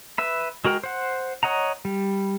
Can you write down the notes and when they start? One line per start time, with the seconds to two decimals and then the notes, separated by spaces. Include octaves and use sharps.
0.18 B4 E5 B5
0.65 G#3 F#4 A#4 G5
0.84 C5 F#5
1.43 C#5 D#5 F#5 A#5
1.85 G3